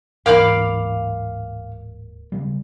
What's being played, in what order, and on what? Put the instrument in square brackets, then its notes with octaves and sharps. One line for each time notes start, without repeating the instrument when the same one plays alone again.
[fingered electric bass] D1 G#2 E3 [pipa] A#3 B5 [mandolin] F5 D6 F6
[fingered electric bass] C#3 G3